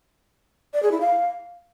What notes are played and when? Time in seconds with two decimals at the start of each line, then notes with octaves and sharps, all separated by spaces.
0.74 D5
0.83 G#4
0.92 E4
1.01 F5